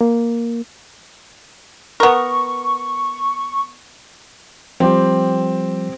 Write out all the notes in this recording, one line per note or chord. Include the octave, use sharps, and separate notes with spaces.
A#3
B3 A#4 C#6
F3 G3 C4 G4